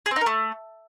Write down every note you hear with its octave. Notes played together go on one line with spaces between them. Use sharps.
G#4
C4
D#4
A#4
A3